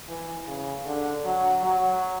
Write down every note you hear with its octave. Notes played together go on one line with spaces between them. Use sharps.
E3
C#3
D3
F#3
F#3